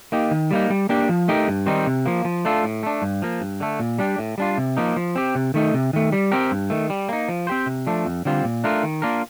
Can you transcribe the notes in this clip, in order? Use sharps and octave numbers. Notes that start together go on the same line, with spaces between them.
A#3 D#4 G4
D#3
G3 A#3 D#4
G3
A#3 D4 G4
F3
A3 D#4 G4 A#4
G2
D#3 G3 C4 D#4
C3
F3 A#3
F3
A3 D4 F4 A4
A2
A3 D4
G2
F3 A#3
G2
D3 A3
A#2
G3 D4 G4
A2
G3 D4 F4
C3
F3 A#3 D#4
F3
C4 G4
C3
D#3 A3 D#4
C3
D#3 A3
G3
C4 G4 A#4
G2
D#3 A3
G3
A#3 D#4
F3
C4 G4 C5
C3
F3 A3 D4
F2
D3 G3 C4 F4
A#2
A3 D4 F4 A#4
D#3
A#3 D4 F4 A#4